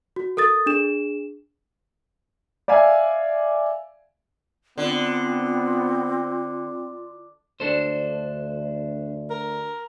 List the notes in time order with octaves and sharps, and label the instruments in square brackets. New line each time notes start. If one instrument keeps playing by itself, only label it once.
[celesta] F#4
A4 A#4 D#6 A6
D4 G#4 E7
[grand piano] D5 E5 F5 G#5
[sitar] D3 [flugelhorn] B3 [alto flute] C4 [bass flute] F4
[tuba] D2 [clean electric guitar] D4 A4 C5
[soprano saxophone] A#4